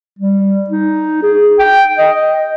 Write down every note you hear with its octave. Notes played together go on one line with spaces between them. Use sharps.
G3
D#4
G#4
G5
D#5